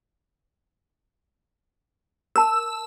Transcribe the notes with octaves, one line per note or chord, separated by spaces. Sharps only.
A#4 A5 E6